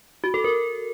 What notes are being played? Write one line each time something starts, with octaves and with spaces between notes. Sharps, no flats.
F#4
A4
A#4